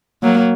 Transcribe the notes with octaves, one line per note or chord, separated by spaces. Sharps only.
F#3 A#3